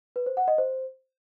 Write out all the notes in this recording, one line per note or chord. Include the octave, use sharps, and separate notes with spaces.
B4
C5
F#5
D#5
C5